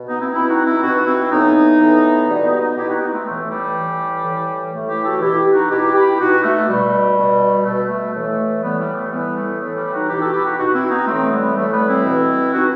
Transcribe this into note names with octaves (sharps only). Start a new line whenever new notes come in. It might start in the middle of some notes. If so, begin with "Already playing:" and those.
Already playing: B2
B3 D#4
C4 E4
B2 C4 E4
D#4 F#4
C4 E4
B2 D#4 F#4
C4 E4
A2 E3 B3 D#4
A2 E3
B2 G3 B3
B3 D#4
B3 D#4
B2 E4 G4
D#4 F#4
B3 D#4
A3 C4
A2 E3 A3
G3
A2 E3
A2 E3
A2 E3 A3
E4 G4
F#4 A4
B2 E4 G4
D#4 F#4
B2 E4 G4
E4 G4
B2 D#4 F#4
A3
B2 G3
B2
B2 A3
A3
A2 E3 A3
A2 E3 G3 B3
G3
A3
A2 E3 G3 B3
A3
A2 E3 A3
G3
D#4 F#4
B2 E4 G4
F#4 A4
E4 G4
D#4 F#4
B2 D#4 F#4
C4 E4
B3 D#4
A2 E3 A3 C4
G3 B3
A2 E3 A3
G3 B3
C4 E4
B2
B2 D#4 F#4